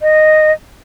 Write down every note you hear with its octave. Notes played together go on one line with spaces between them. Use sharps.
D#5